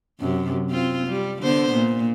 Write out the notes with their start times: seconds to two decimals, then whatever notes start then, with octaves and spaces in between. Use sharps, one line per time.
0.20 F#2 C3
0.70 C4 F4
1.08 G3
1.42 D3 B3 C5
1.74 A#2